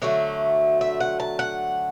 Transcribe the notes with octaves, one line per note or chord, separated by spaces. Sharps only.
D3 F#3 A3 E5
E5
F#5
A5
F#5